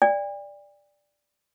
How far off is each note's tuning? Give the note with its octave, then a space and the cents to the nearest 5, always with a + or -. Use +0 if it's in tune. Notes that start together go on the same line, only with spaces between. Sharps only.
D5 +0 G5 +45